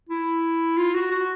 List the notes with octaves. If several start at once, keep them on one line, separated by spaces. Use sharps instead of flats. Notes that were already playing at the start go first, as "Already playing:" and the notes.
E4
F4
F#4
F#4